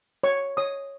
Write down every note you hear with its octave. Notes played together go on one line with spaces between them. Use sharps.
C#5 C#6
C#5 D#6